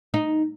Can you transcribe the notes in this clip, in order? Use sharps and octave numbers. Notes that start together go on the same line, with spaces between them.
D#4